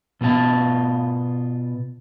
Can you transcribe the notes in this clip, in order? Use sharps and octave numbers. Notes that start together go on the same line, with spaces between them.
B2 B3 F4 A4 A5